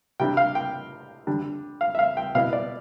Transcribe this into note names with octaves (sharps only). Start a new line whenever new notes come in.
C3 G3 D4 G5
F5
G5
D3 G3 D4
F5
E5
F5
G5
B2 B3 E4 F5
D5